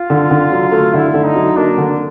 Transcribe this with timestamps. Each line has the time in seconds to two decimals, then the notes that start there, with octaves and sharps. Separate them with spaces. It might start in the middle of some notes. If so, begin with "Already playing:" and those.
Already playing: F4
0.10 D3
0.31 D3
0.52 F#3
0.72 A3
0.94 D3 E4
1.14 D3
1.25 D#4
1.35 F#3
1.56 A#3 D4
1.78 D3